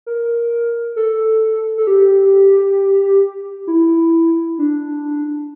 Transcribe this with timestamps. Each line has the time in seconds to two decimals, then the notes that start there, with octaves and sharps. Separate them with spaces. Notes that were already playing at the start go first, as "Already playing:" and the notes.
0.06 A#4
0.96 A4
1.78 A4
1.87 G4
3.67 E4
4.58 D4